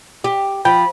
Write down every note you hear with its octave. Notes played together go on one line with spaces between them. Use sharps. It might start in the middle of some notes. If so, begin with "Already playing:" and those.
G4
F3 G5 B5